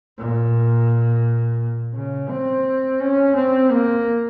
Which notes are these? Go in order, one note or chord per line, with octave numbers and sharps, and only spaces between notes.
A#2
C#3
C4
C#4
C4
A#3